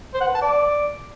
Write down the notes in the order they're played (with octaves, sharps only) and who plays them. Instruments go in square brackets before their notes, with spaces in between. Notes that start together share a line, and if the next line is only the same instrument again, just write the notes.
[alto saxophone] C5
F#5
B4
A5
D5